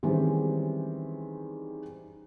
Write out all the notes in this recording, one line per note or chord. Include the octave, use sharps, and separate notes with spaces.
D#3 E3 G3 G#3 C4 C#4